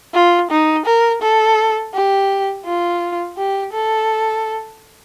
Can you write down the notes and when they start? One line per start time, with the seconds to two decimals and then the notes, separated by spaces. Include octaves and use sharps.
0.14 F4
0.51 D#4
0.86 A#4
1.22 A4
1.94 G4
2.65 F4
3.37 G4
3.73 A4